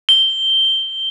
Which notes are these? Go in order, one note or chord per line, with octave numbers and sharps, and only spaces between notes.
G7